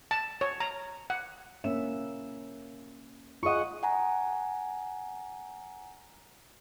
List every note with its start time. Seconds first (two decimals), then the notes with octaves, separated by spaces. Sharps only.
0.11 A5
0.41 C#5
0.60 A#5
1.10 F#5
1.64 A#3 C#4 E5 E7
3.43 F4 G#4 D#5 F#5 C#6
3.83 F#5 G#5 A#5